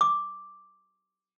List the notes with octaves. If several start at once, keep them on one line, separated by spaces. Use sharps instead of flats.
D6